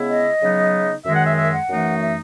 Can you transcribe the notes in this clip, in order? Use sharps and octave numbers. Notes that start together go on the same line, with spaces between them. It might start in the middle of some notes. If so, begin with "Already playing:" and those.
Already playing: C#3 G#3 B3 E4
D#5
C#3 F#3 B3 D#4
F#2 D#3 G#3 E5
F#5
E5
E5
F#5
F#2 E3 A3 D#4
E5